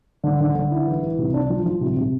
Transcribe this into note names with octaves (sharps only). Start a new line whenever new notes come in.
D3
D3
D3
E4
E3
E3
C3
D4
F3
F3
C3
C3